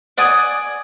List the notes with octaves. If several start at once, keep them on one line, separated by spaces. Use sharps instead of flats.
D5 F#5 G#5 D#6